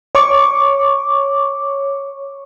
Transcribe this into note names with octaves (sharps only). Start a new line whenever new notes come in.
C#5 C#6 D6